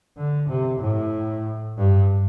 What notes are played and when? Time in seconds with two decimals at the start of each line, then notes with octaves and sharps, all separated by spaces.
0.17 D3
0.49 C3
0.80 A2
1.77 G2